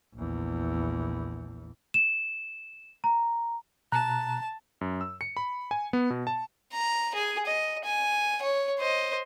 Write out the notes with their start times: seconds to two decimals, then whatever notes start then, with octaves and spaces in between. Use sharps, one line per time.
0.15 A#1 E2
1.94 E7
3.04 A#5
3.92 B2 A5 A#5 F#6
4.81 F#2
5.01 E6
5.21 C#7
5.37 B5
5.71 G#5
5.93 B3
6.10 B2
6.27 A5
6.72 A#5
7.14 G#4 G#5
7.46 D#5
7.84 G#5
8.42 C#5
8.79 C5 D#5